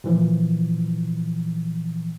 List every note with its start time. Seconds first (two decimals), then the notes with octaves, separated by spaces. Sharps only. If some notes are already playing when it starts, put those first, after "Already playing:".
0.04 A#2 E3 F3